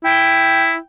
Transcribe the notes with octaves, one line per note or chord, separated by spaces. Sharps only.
E4 G5